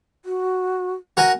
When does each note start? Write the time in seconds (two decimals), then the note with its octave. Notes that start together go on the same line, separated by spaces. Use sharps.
0.25 F#4
1.17 F#4 A#4 G#5